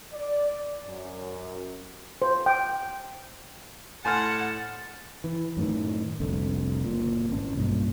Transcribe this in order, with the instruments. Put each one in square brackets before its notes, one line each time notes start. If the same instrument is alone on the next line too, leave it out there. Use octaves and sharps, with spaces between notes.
[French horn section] D5
F#2
[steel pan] C5
G5
[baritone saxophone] A2 [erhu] F#5 [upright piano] G#5 C6 F6 [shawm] A5
[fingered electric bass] E3
F#2 A2 D#3
F1 C2 D3
F#1 A#2
G#1 C#4
B1 G2 A#2